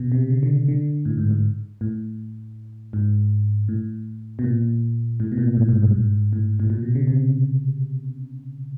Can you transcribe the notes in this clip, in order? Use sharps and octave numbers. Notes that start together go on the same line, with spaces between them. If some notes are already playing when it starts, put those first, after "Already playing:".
Already playing: B2
C3
C#3
D3
D3
A2
G#2
G#2
A2
G#2
A2
B2
A#2
A2
B2
A#2
A2
G#2
G2
G#2
A2
A2
A#2
B2
C#3
C3